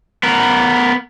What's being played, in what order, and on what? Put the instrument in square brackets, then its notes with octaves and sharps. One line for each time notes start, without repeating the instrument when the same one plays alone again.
[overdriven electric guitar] B3 A#4